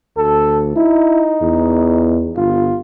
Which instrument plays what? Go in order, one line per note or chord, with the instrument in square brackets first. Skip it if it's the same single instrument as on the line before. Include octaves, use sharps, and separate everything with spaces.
[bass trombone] D2 [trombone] A4
[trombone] D#4 [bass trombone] E4
[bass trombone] E2
[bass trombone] G1 [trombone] F4